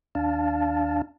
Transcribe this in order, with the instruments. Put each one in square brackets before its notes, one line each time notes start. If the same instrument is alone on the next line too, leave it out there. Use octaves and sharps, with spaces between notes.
[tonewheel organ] D#2 D4 F5 A5